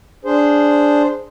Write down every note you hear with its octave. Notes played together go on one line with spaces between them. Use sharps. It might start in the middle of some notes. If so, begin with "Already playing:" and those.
D4 G#4 C5